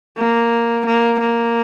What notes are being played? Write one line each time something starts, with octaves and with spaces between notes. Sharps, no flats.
A#3
A#3
A#3